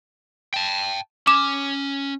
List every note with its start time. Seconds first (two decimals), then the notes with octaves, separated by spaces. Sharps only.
0.54 G5 A5
1.27 C#4 D6 E7